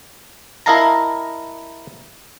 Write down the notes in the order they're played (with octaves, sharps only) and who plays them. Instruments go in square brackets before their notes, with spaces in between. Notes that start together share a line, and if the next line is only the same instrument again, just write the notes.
[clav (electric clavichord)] E4 A#4 D#5 F5 A5 A#5